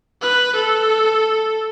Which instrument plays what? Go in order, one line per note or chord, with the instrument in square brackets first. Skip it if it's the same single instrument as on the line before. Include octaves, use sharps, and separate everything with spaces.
[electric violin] B4
A4